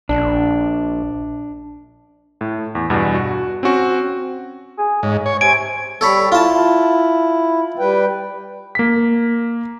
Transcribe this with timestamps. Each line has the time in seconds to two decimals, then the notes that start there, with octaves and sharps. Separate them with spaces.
0.09 A#1 D4
2.41 A2
2.75 E2
2.90 E2 G2 B2
3.15 F#4
3.63 C4 C#4 F#4
4.78 G#4
5.03 G#2 C#3
5.26 C#5
5.41 C3 G#5 D7
6.01 G3 A4 C#5 B5
6.32 E4 F4 A5
7.79 G3 B4 G5
8.75 A#3 B6